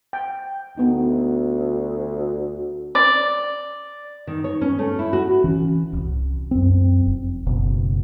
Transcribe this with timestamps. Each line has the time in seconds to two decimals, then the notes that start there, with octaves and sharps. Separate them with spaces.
0.13 G5
0.77 D2 B3 D#4
2.95 D5
4.27 D#3
4.44 C#5
4.61 C#4
4.79 A3
4.99 E4
5.13 F#4
5.44 E3 C#4
5.93 D1 C2
6.51 F#2 C4
7.05 F1
7.46 F#1 C#2 B2